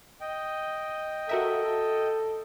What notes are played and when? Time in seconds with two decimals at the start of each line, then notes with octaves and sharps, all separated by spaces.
0.21 D#5 G5
1.29 F#4 A4 A#4 E5